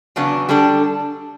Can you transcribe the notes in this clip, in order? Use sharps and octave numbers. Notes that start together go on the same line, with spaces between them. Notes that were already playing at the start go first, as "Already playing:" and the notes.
E2 C#3 F#3 B3 D4
D3 G3 D4 A4